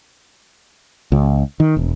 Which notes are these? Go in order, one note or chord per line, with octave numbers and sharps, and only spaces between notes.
C#2
D#3
E1